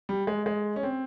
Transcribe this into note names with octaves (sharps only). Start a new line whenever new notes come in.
G3
G#3
G#3
C#4
C4